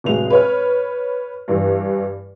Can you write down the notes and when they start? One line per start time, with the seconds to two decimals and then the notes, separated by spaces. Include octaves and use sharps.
0.04 F1 A2 F#3 G#3 F7
0.30 B4 C#5 F6
1.48 G2 E3